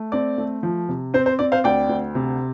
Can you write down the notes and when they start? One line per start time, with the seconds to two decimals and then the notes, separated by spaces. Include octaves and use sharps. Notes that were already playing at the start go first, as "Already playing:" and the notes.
Already playing: A3
0.12 C4 D5
0.38 A3
0.63 F3
0.89 C3
1.14 C4 C5
1.26 C5
1.39 C4 D5
1.52 C5 F5
1.64 D2 D5 G5
1.89 D2
2.15 C3